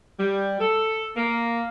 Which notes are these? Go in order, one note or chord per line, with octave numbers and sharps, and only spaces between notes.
G3
A4
A#3